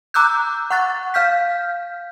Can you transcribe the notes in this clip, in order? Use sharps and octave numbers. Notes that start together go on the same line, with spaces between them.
A#5 D6 E6 F#6 G6
F#5 C#6 F#6 A6
F5 F6 G6 B6